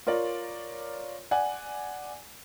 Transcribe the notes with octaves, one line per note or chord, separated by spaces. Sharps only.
F4 A#4 C#5 D5
D5 F#5 G#5